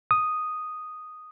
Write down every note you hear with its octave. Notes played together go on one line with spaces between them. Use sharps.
D#6